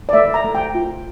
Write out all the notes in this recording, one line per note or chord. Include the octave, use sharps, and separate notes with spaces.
D5
A3 E5
A#5
A3
G5
F4